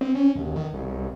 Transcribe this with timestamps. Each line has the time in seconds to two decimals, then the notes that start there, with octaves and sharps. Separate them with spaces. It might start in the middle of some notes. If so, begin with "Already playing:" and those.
0.01 C4
0.15 C#4
0.35 D#2
0.56 D#3
0.73 C2